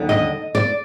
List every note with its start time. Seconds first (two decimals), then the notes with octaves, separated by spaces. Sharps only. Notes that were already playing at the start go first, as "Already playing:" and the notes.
Already playing: D#2 D3 G3
0.09 D#5
0.55 D5